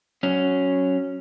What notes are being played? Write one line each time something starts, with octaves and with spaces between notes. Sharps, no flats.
F#3 C#4